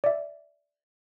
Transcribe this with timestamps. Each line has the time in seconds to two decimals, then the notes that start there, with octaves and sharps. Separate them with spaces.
0.04 D5 E5